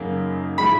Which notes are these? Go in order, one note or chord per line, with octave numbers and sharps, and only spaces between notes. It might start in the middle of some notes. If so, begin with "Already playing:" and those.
Already playing: F#2 C#3 F#3 A#3 D#4
A2 F3 G#3 B5